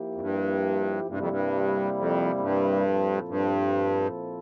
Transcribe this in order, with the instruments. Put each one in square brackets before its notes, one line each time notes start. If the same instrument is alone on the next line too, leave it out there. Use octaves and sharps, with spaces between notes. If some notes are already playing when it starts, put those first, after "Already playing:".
Already playing: [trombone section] F3 A#3 E4 G4
[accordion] F2
G2
[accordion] G2 [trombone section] C3 G3 A#3 E4
[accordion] F2
G2
F2
F2
G2
[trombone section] A#2 F3 C4 E4 A4
[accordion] G2